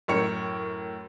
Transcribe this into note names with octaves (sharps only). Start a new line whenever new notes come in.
F#2 A2 A#4 C#5 G5 C#7